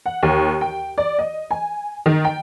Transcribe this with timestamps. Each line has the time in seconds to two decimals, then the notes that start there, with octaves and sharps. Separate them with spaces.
0.06 F#5
0.23 D#2
0.61 G5
0.98 D5
1.19 D#5
1.51 G#5
2.06 D#3
2.25 G5